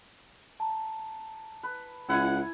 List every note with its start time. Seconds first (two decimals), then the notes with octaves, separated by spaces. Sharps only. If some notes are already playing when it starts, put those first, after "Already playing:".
0.60 A5 A#5
1.63 B4
2.09 C#2 E4 F#5 G#5